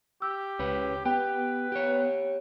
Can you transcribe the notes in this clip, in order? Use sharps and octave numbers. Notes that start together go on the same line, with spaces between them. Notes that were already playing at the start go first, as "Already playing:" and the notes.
G4 E6
C#2 C#4 B4
B3 G4 B4 G5
G4 C#5